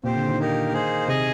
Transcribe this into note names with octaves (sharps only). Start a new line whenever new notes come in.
A#2 C4 G4 C5
D3
D#3
A#3 D#4 G4 A#4
A#3 D#4 G#4 C5
C3 G#4 D#5 G#5